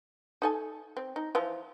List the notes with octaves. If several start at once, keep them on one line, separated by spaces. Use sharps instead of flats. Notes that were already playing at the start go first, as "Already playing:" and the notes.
D#4 A4 G#5
C4
D#4
E3 F3 F4